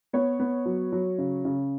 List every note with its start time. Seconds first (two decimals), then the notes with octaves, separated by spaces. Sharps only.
0.13 B3 C#5
0.39 B3
0.66 F#3
0.92 F#3
1.18 C#3
1.45 C#3